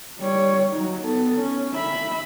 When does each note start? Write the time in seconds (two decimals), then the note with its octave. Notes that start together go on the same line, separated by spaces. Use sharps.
0.19 G3 C#5
0.73 F#3 D#4
1.04 B3 A4
1.41 C#4
1.74 E5 B5